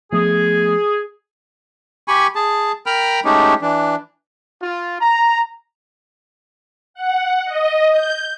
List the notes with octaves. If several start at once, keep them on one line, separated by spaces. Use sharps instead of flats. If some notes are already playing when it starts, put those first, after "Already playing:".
F3 A3 B3 G#4
G4 G#5 B5 C#6
G#4 A5
A#4 G5 A#5 B5 F6
G#3 A3 C#4 D#4 G4
E3 D4
F4
A#5
F#5
D#5
G6